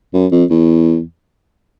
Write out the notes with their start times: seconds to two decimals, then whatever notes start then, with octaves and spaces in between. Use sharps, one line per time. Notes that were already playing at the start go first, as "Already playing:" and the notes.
0.13 F#2
0.31 F2
0.50 E2